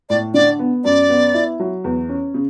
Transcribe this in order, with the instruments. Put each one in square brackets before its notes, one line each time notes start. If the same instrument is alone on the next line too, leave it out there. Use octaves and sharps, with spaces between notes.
[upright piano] A2 [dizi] D5
[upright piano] D3 [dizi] D5
[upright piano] B3
[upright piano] F#2 [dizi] D5
[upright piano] B3
E4
F#3
E2
C#4
C#3